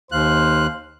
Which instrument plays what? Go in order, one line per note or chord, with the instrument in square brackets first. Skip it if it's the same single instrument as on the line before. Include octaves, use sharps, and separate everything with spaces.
[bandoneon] D#2 F#6 [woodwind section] C5 F5